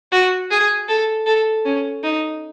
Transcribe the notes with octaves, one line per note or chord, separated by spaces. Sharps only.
F#4
G#4
A4
A4
C#4
D#4